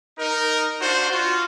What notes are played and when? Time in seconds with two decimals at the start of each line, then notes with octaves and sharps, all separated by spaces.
0.19 D#4 A#4
0.81 D4 F4 F#4 C5
1.10 F4 F#4